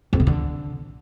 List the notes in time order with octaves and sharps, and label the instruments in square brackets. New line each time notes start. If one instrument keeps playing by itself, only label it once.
[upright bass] F2
C3
D3